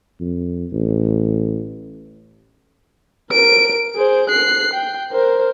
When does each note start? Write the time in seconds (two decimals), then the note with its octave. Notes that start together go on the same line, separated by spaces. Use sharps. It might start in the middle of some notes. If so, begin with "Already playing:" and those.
0.21 F2
0.72 A1
3.31 A#4 D7
3.96 G#4 C5
4.29 F#6 C7
4.73 G5
5.12 A#4 C5